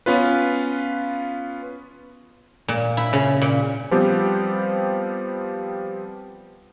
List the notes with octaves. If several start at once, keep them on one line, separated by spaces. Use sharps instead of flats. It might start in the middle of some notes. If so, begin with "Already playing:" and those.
B3 C#4 F4 B4
A#2
E4
C#3
A#2
F3 G3 B3 C4 G4